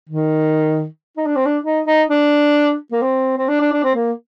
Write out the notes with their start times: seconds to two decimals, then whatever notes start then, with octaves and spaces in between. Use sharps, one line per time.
0.09 D#3
1.17 D#4
1.26 D4
1.36 C4
1.46 D4
1.64 D#4
1.86 D#4
2.10 D4
2.92 A#3
3.02 C4
3.38 C4
3.48 D4
3.60 D4
3.73 D4
3.84 C4
3.95 A#3